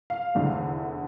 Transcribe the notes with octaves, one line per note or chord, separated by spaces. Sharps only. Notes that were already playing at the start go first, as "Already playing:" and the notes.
F5
F1 E2 D3 A3